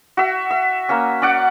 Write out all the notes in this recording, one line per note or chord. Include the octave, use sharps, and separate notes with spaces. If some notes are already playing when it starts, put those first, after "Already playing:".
F#4 E5
E5
A#3 C#4
C#4 D5 F#5